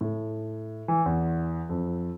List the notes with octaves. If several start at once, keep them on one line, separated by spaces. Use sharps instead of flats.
A2
E3
E2
F2